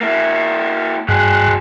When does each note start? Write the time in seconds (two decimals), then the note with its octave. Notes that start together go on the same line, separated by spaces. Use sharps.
0.01 A#3 E4
1.09 G2 F#3 G#4 F#6